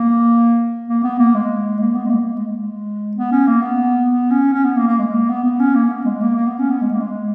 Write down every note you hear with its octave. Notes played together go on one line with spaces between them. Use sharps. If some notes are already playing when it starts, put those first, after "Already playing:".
Already playing: A#3
A#3
B3
A#3
G#3
A#3
B3
G#3
A#3
A#3
G#3
G#3
B3
C#4
A#3
B3
B3
C#4
C#4
B3
A#3
A#3
G#3
A#3
B3
B3
C#4
A#3
B3
G#3
A#3
A#3
B3
C#4
B3
G#3
A#3
G#3